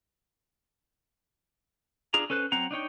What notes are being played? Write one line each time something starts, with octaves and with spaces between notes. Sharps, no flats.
D4 F4 G#4 A#5
C#4 A4 B4 C5 F#6
F#3 C4 F#5 A#5
D4 D#4 C#5 G5